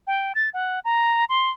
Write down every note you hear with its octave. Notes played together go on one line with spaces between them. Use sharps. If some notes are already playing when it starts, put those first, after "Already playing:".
G5
A6
F#5
A#5
C6